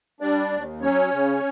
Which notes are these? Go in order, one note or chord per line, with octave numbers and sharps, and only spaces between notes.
G3 D4 D5
D#2
F#3 C#4 C#5
C#3